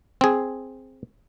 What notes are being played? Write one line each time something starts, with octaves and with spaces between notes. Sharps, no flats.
C4 G#4